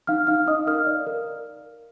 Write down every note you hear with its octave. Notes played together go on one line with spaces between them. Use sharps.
D#4 F5 F6
D#4 F5 F6
D#4 D#5 D#6
A#4 F5 F6
D5
A#4